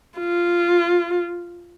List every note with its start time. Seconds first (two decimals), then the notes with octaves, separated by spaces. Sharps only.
0.19 F4